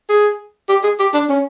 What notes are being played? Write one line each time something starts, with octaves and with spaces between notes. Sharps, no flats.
G#4
G4
G#4
G4
D4
C#4